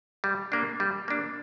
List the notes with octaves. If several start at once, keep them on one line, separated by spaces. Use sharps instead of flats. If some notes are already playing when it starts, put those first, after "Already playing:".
G3
A#3 D4
G3
A#3 D4